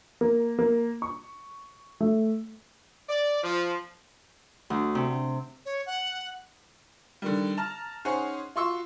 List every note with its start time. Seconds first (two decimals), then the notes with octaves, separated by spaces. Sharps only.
0.21 A#3
0.59 A#3
1.02 C#6
2.01 A3
3.09 D5
3.43 F3
4.70 D2
4.95 C3
5.65 C#5
5.86 F#5
7.22 D3 D#3 G3
7.57 A5 A#5 F6
8.05 C#4 D#4 G#4 C5 C#5 F#5
8.56 F4 F#4 C6 C#6 E6